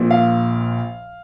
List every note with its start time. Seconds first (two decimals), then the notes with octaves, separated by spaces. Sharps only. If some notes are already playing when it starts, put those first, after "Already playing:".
Already playing: A#1 A#2 F3
0.11 F5